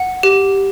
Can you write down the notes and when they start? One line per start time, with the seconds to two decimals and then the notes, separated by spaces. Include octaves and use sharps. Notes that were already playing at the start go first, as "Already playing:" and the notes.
Already playing: F#5
0.23 G4